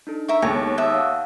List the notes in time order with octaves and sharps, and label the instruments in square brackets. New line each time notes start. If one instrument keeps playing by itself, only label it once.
[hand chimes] D4 D#4 A4
[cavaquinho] A#4 E5 C#6
[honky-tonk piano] D#2 G#3 [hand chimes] B3 G#4 A4 [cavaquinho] C#5
[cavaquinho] E5 D#6 [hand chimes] A5 E6 F#6
[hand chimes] C#5 F5 F#5